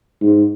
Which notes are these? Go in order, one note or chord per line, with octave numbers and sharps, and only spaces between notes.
G#2